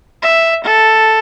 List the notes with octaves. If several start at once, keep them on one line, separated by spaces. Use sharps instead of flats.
E5
A4